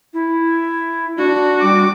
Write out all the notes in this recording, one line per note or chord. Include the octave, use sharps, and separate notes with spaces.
E4
D4 F#4
G3 D6